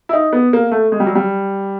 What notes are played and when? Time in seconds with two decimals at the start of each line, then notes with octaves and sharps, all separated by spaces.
0.09 E4
0.13 D#4
0.33 B3
0.53 A#3
0.72 A3
0.92 G#3
1.00 G3
1.06 F#3
1.15 G3